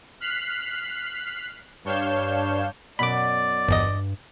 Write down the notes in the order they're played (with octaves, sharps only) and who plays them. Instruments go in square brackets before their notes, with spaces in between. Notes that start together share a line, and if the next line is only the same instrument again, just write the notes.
[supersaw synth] F6 F#6 B6 C7
G2 D4 C#5 F5 G6 E7
[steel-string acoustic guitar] F#2 B2 [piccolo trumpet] D5 [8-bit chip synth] B5 D6
[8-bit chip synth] G1 E2 D#5 [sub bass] G2